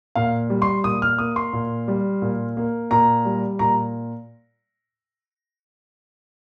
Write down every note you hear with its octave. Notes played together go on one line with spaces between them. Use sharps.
A#2 F5
G3
C6
A#2 D#6
F6
A#3 D#6
C6
A#2
G3
A#2
A#3
A#2 A#5
G3
A#2 A#5